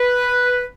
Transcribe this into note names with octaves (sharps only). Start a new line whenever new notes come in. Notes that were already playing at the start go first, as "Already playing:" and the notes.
Already playing: B4